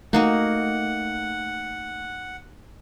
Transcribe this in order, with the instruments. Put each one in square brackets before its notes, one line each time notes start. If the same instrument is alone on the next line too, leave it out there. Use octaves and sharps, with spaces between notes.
[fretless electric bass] A3 [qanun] A#3 D#4 F#4 [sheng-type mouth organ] F#5